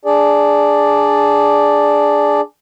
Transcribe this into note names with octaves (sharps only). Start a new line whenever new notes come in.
D4 G#4 D5